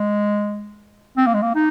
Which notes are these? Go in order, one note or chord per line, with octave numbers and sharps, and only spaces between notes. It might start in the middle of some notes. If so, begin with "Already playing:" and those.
Already playing: G#3
C4
A#3
G#3
A#3
D#4